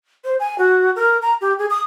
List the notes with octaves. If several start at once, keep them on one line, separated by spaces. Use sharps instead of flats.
C5
G#5
F#4
A#4
A#5
G4
G#4
D#6